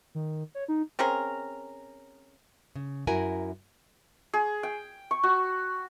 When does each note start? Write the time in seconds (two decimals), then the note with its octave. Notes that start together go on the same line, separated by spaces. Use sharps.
0.15 D#3
0.55 C#5
0.68 D#4
0.99 C4 C#4 G#4 A#4
2.75 C#3
3.07 F#2 E4 F#4 A#4 G#5
4.33 G#4
4.63 G5
5.11 C#6
5.23 F#4